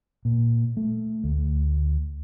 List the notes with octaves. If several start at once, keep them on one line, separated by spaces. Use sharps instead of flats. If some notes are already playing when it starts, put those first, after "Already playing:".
A#2
A3
D2